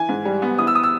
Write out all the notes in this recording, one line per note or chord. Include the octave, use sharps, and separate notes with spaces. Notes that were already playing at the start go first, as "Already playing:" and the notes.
Already playing: E3 G#5
G#2
G3
B3
E3 D#6
E6
D#6
E6